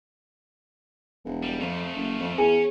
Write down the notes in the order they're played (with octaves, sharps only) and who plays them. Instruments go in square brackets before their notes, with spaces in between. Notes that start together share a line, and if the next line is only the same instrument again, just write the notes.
[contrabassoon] E1
[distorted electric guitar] G3
[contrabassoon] F2 [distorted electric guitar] A3 F4
[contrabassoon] F#1
F2
[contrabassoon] E2 [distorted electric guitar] C#4 [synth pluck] G#4